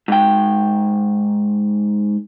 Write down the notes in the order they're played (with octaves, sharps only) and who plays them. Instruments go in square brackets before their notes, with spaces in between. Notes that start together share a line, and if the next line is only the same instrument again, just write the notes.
[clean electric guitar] G#2 G5